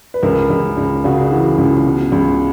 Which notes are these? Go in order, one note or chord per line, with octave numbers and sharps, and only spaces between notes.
B4
C#2 A#4
C#2
C#2
C#3 F#4
G#4
E3 F#4
C#2
B2
C#2